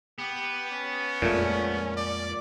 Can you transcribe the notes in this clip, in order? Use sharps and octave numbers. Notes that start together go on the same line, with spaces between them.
B3 G4
C#4
F2 A#2 G#3 A3
D5